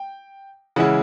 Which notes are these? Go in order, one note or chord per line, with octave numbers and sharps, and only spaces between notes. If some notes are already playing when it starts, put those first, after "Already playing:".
Already playing: G5
C#3 E3 G#3 C#4 E4 F#5